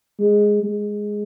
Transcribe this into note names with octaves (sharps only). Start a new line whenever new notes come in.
G#3
G#3